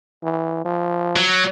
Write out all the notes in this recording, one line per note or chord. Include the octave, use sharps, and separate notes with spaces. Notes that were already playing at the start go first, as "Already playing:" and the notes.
E3
F3
F#3